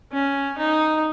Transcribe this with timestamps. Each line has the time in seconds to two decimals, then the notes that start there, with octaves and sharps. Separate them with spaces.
0.12 C#4
0.58 D#4